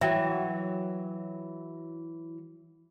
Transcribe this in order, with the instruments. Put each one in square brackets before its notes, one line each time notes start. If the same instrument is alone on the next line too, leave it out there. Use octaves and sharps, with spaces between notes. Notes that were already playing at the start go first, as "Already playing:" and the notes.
[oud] E3 F#3 [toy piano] E5 G5